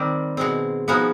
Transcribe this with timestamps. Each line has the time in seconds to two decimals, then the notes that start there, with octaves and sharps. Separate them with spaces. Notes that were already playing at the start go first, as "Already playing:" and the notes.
Already playing: D#3 G3 C4
0.37 B2 G#3 C4
0.88 F3 G#3 B3 D#4 F#4